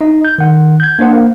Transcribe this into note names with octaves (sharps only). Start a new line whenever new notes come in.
D#4 D#5
G6
D#3 F#5
G6 G#6
A#3 D4 C5 F#5
A#3